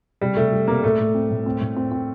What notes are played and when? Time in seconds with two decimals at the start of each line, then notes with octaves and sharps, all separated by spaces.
0.21 C3 G3
0.37 C3 A3
0.52 G3
0.68 C3 A#3
0.84 A2 A3
0.99 A2
1.14 C4
1.30 A2
1.46 C4
1.61 A2
1.76 C4
1.92 C4